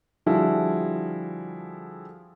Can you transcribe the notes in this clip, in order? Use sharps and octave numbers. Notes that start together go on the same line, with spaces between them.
D3 F3 G3 E4 F#4 G#4